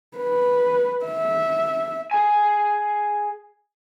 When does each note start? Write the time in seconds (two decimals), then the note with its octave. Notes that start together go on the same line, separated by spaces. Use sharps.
0.18 B4
1.06 E5
2.11 G#4 G#5